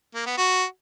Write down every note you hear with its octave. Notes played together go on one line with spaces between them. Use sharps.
A#3
B3
F#4